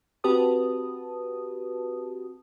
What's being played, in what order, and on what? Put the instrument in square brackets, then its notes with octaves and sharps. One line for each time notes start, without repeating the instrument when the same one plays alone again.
[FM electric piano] C4 F#4 G4 B4 A5 D#6